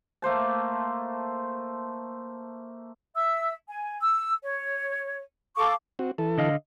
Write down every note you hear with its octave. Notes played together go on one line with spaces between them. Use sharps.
A3 A#3 C5 A5
E5 E6
G#5
E6
C#5
A4 F5 C#6 D6
C4 F#4
E3 A4
D3 D#5 F5